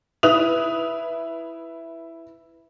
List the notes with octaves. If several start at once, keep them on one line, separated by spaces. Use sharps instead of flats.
E4 B4 D#6 F#6 F7